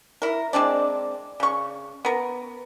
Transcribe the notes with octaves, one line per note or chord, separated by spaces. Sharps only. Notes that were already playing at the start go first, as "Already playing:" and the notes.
E4 A#4
G#3 C4 D4 D5
C#3 C#6
B3 A#4